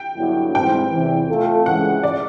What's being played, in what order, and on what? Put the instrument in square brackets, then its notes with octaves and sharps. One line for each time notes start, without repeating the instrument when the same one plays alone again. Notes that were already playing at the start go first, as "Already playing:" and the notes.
Already playing: [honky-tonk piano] G5
[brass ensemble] G2 D3 F#3 B3 E4
[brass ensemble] G#2 E3 G3 C4 [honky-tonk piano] G5
[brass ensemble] E2 C3 E3
A3 C4 F4 A4
[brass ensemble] C#3 E3 G#3 [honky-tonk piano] F#5
[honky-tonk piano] D5